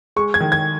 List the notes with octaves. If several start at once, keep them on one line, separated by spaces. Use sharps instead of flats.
G#3 C#6
G#6
D#3
G#6